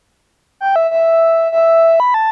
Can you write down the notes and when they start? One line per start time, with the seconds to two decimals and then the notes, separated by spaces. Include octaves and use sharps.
0.61 G5
0.76 E5
0.91 E5
1.52 E5
2.00 B5
2.14 A5